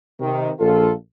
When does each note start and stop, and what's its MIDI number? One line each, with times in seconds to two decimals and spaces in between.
0.20 0.49 48
0.20 0.49 51
0.60 0.92 34
0.60 0.92 65
0.60 0.92 69